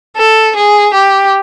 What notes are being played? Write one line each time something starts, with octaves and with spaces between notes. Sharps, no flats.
A4
G#4
G4